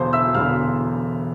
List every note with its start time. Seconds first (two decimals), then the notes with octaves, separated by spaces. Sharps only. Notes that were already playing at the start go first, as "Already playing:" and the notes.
Already playing: E1 E2 D3 C5 C6
0.13 E5 E6
0.34 E1 E2 D3 F5 F6